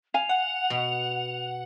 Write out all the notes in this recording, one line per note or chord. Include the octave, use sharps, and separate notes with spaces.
F5 G#5 F7
F#5
B2